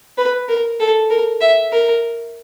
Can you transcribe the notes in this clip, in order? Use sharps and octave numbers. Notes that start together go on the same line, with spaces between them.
B4
A#4
A4
A#4
E5
A#4